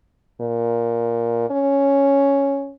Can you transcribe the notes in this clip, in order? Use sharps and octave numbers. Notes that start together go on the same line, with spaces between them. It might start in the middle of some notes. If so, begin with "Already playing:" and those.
A#2
C#4